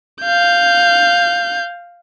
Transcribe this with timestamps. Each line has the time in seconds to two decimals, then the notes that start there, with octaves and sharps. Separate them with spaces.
0.22 F5 G6